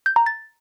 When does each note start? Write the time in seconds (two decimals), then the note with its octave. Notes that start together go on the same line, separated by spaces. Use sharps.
0.06 G6
0.16 A#5
0.26 A6